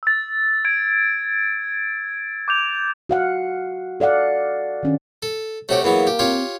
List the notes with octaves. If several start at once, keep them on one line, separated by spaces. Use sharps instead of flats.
E6 A6
G#6 D7
D6 G6 F7
F#4 F5 F#5
A4 D5 F5 F#5
D#3 C#4 D4
A4
C3 A3 F#4 G4 C#5
E3 F#3 A#3 B3 G#4
G4
C4 F4 G4 C#5